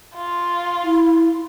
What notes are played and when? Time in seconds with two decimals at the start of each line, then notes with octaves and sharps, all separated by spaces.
0.14 F4
0.83 E4